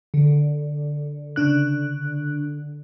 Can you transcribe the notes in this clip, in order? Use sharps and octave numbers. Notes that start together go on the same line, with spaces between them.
D3
C#3 D4 F#6